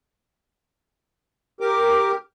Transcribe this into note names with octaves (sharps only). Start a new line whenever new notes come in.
G4 A#4 D6